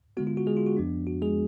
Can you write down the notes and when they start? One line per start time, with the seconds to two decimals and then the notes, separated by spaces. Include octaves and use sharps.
0.17 D3 G#3 B3 F#4
0.27 F4
0.37 F#4
0.47 G#3 G#4
0.57 F4
0.66 F#4
0.77 F2 F3 B3 D4
1.07 F#4
1.22 G#3 G#4